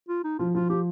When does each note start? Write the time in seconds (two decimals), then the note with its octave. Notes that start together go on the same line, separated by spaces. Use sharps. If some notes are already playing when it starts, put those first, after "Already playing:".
0.09 F4
0.24 D#4
0.39 F3 F4
0.55 F3 F4
0.70 F3 G4